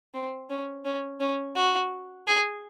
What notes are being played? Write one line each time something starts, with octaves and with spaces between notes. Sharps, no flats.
C4
C#4
C#4
C#4
F#4
G#4